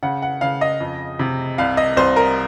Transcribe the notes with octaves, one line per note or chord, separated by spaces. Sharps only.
C#3 F#5
F#5
C#3 F5
D#5
F2
C3
C2 F5
D#5
C2 C5
A#4